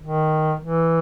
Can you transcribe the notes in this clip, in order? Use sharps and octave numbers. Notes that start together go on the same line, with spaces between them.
D#3
E3